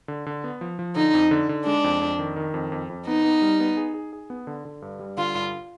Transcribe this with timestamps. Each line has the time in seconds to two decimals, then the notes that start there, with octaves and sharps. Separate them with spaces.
0.08 D3
0.26 D3
0.44 B3
0.61 F3
0.79 F3
0.96 D3 D#4
1.14 F2
1.31 D3
1.49 D3
1.66 G#3 D4
1.84 F2
2.02 F2
2.19 D#3
2.36 D#3
2.54 F2
2.72 F2
2.90 F2
3.07 B3 D#4
3.24 B3
3.42 G3
3.60 B3
3.77 G#4
3.94 G#4
4.13 G#4
4.30 B3
4.47 D3
4.65 D3
4.82 G2
5.00 G3
5.17 D3 F4
5.35 G2